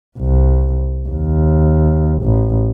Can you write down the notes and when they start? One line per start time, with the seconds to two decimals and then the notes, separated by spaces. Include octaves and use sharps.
0.19 C2
1.09 D#2
2.23 A1